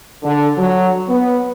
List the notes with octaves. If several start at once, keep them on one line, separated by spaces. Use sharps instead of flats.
D3
F#3
B3